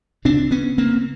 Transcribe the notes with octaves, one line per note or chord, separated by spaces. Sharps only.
D2 C#3 C4 D4
B3 C#4
A#3 C4